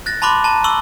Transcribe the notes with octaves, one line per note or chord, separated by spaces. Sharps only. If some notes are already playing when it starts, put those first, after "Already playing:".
F#6 A6 A#6
A5 B5 C6 D6 F#6
A5 A#5
C#6 D6 E6 F#7 G7